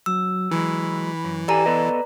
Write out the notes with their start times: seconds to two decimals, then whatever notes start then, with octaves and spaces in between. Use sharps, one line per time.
0.06 F#3 E6
0.51 E3 F#3 G#3 B5
1.24 F#2
1.48 G4 A4 B4 D5 G#5 A#5
1.66 B3 A4 B4 D#5